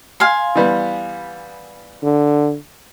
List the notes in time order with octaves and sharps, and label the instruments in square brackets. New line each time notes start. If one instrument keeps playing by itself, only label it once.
[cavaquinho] F5 G#5 C6
[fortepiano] E3 G3 B3
[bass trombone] D3